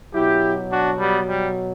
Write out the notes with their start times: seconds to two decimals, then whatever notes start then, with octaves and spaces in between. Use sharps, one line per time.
0.13 B2 F#3 E4 G4
0.70 D4 F#4
0.99 G3 B3
1.27 G3